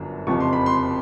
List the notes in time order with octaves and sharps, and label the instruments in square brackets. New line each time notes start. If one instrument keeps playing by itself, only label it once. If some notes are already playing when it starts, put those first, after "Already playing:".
Already playing: [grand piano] G1 F#2 D3 F#3
F#1 F2 C3 F3 C#6
C6
B5
C6